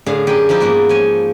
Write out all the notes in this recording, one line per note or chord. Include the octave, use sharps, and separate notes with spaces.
A2 D3 G#4 F5
F#2 G4 G#4 A#4 G5 G#5
F3 D#4 E4 G4
E2 G#2 A#3 F#4
F3 C#5 G#5